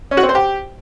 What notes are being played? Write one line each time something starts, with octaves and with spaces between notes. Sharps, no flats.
C#4
F#4
C4
C5
G4